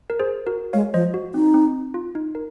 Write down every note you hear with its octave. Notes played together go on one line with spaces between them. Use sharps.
A#4
G#4 C5
F#4 A#4
G#3 C#5 F5
F3 C5 D#5
F#4
C4 D#4
C4
F4
D#4
A#4